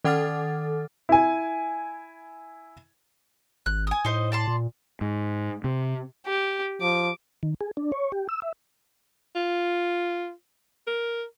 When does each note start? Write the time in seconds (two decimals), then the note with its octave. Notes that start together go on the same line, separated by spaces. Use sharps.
0.04 D#3 A4 F#5 D6 F6 A6
1.09 E4 G#5
3.66 G#1 F#6
3.87 G#5 D#6
4.05 A2 D#4 C5 D#5
4.32 D5 A5 C6
4.47 A#2
5.01 G#2
5.64 C3
6.26 G4
6.81 F3 D6
7.43 D#3
7.61 G#4
7.77 D4
7.92 C#5
8.12 G4
8.29 E6
8.42 E5
9.36 F4
10.87 A#4